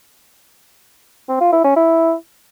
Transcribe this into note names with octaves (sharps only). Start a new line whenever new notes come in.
C4
F4
E4
C#4
E4